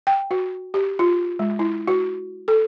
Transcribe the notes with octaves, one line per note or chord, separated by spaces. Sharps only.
G5
F#4
G4
F4
G#3
E4
F#4
A4